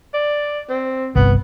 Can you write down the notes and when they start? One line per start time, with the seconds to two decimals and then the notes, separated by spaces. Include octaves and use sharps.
0.14 D5
0.70 C4
1.16 G1 C2 B3